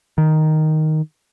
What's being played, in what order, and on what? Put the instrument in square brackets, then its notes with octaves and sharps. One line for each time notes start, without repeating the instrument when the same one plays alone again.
[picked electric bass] D#3